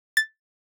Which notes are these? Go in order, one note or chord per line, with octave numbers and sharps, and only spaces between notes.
A6